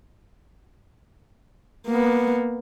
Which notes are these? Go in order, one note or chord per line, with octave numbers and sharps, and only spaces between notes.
A#3 B3